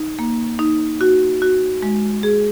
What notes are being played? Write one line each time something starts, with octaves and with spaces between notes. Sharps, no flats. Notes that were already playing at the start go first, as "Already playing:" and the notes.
Already playing: D#4
A#3
D#4
F#4
F#4
G#3
G#4